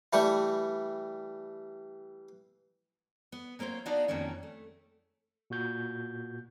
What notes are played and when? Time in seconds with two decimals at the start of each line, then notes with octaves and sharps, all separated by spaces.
0.13 E3 G3 A3 C#6
3.32 B3
3.59 F#3 A#3 C4 C5 C#5
3.86 B3 D4 D#4 F#4 D5 F5
4.08 F2 D#3 F#3 A#3 C#4
4.43 A3
5.50 A#2 F#4 G6